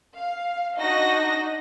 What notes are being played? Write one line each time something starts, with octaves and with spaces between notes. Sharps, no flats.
F5
D4 D#4 F#4 D#5 A#6